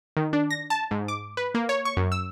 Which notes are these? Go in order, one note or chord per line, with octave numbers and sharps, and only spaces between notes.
D#3
D4
A#6
A5
G#2
D6
B4
A#3
C#5
C#6
F#2
E6